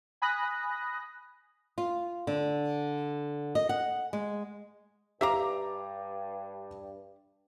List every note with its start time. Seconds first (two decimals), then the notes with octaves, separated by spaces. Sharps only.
0.22 G#5 B5 D#6 F#6 A#6
1.78 F4
2.27 D3
3.55 D#5
3.69 F#5
4.13 G#3
5.21 G2 G4 E5 F5 A#5 D6